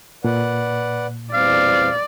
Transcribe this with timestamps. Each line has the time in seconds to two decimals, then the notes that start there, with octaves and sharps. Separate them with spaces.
0.24 A#2 B4 D5 F#5
1.34 E2 G3 C4 D5 F5